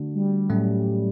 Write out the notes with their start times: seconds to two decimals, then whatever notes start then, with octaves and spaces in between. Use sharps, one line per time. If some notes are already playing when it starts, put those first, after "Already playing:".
Already playing: D3 A3 D4 F#4
0.14 G3
0.50 A2 F#3 A3 C#4